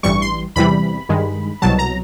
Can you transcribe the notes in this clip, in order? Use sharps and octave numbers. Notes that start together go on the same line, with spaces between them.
A1 G2 E3 G3 C#6
C6
E2 C3 E3 G3 B5
G2 D#3 G#3
C2 B2 F#3 A5
A#5